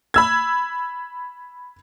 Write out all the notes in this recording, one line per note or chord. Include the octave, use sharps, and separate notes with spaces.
B5 E6 G#6